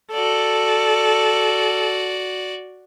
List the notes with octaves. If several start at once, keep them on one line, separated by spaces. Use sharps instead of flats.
F#4 A4 D5